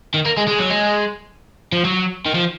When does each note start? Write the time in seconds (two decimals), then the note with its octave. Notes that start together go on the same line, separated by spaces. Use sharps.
0.14 D#3
0.26 A#3
0.38 G#3
0.48 G#3
0.59 F#3
0.70 G#3
1.72 F3
1.85 F#3
2.25 D#3
2.34 F3